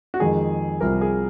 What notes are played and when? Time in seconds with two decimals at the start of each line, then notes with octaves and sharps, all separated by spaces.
0.14 F#4
0.19 F2 D#3 G#3 G#4
0.81 C2 C3 F3 A#4
1.01 G#4